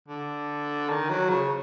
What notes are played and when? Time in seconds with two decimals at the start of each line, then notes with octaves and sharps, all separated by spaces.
0.08 D3
0.89 D#3
1.10 F#3
1.30 C#3